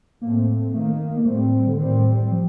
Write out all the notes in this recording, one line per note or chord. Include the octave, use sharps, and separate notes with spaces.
A2 A3 A#3 C4
D#3 A3 A#3
A#3
A2 G3 A3 C4
D3
A2 D#3 G3 C4
F3